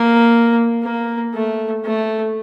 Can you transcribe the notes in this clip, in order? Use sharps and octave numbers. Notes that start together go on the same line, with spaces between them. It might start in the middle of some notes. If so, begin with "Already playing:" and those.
Already playing: A#3
A#3
A3
A3